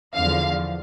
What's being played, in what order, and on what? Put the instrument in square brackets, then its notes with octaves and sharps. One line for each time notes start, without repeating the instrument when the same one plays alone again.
[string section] E2 D3 F3 F5